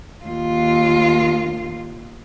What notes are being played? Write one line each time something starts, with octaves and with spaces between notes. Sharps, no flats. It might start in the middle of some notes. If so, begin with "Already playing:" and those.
D#2 F4